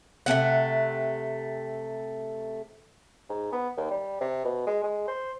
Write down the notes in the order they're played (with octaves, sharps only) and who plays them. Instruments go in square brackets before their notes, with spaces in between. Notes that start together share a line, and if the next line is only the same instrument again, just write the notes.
[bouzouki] C3 A3 C4 F#5
[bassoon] G#2
B3
D#2
G3
C3
B2
G#3
G#3
C5